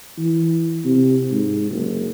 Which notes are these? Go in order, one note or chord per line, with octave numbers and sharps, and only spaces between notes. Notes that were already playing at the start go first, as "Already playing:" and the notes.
E3
C3
G#2
F#1